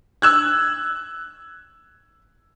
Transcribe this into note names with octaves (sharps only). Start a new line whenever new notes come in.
E6 F#6 G#6